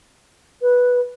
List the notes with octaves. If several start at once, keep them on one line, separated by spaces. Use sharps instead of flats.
B4